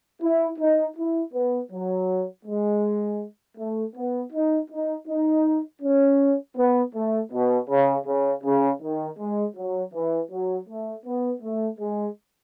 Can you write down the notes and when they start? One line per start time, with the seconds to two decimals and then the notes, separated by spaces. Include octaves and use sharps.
0.22 E4
0.59 D#4
0.97 E4
1.33 B3
1.71 F#3
2.45 G#3
3.57 A3
3.96 B3
4.32 D#4
4.70 D#4
5.08 D#4
5.82 C#4
6.56 B3
6.94 A3
7.32 B2
7.69 C#3
8.06 C#3
8.43 C#3
8.81 D#3
9.18 G#3
9.56 F#3
9.93 E3
10.31 F#3
10.68 A3
11.06 B3
11.42 A3
11.79 G#3